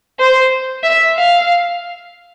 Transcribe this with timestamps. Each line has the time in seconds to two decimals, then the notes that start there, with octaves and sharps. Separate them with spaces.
0.19 C5
0.84 E5
1.16 F5